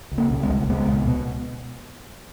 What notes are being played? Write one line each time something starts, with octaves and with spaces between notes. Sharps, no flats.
C#2
A#3 C#4
B2
G#3 B3
C#2
C#2 G#3 B3
B2
B2